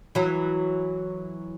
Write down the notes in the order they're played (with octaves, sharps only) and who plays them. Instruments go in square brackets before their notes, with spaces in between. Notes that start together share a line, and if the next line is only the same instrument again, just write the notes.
[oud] E3 F#3